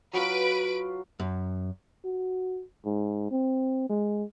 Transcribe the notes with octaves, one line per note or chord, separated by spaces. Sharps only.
F#3 F4 B4 D7
F#2
F#4
G#2
C4
G#3